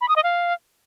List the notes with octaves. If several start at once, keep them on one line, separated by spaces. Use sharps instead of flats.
B5
D#6
D#5
F5